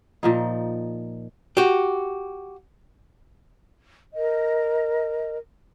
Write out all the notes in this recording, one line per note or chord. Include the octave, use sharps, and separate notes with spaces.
A#2 F3 D#4
F#4 G4
A#4 D#5